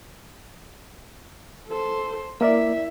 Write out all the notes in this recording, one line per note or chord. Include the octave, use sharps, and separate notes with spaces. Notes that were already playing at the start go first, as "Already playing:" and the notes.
A4 C5
A#3 E4 A#4 D5 E5